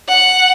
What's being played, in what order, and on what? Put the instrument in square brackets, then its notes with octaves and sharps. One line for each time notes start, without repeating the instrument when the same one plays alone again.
[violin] F#5